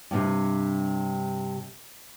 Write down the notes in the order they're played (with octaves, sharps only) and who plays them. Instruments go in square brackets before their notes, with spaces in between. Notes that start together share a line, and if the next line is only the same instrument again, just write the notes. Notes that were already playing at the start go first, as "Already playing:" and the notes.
[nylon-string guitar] G2 C3